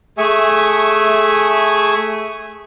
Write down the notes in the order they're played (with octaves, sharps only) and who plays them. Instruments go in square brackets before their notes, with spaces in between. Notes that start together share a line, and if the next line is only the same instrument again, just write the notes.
[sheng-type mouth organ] A3 G#4 E5 G#5 C#6